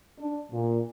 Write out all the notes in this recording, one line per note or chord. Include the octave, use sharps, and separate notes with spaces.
D4
A#2